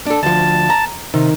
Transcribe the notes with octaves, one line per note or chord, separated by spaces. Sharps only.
D4 A4
D2 F3 A5
A#5
C3 D#3